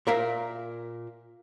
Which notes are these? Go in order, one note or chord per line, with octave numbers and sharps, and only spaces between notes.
A#2 A#4 E5 F5